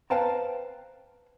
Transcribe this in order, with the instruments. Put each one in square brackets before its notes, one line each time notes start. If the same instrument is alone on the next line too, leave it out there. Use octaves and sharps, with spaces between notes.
[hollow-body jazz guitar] B4 C5 F5 G5 A5 A#5